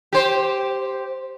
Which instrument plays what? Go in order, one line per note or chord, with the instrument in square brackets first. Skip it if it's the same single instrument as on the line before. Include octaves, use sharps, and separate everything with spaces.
[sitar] G4 C5